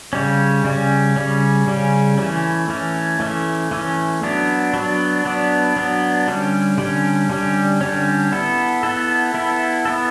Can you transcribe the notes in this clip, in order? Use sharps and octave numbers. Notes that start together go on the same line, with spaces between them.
C#3 G3 C#4
C#3 G3 C#4
C#3 G3 C#4
C#3 G3 C#4
E3 A3 C#4
E3 A3 C#4
E3 A3 C#4
E3 A3 C#4
F#3 B3 D4
F#3 B3 D4
F#3 B3 D4
F#3 B3 D4
D3 G3 C#4
D3 G3 C#4
D3 G3 C#4
D3 G3 C#4
B3 E4 A4
B3 E4 A4
B3 E4 A4
B3 E4 A4